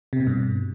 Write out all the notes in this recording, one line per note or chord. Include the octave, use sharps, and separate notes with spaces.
C3
B2
G2